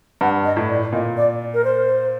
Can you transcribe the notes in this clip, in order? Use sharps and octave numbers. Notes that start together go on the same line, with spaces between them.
G2 F#5
D#5
A2
D5
A#2 D#5
D5
A#4
C5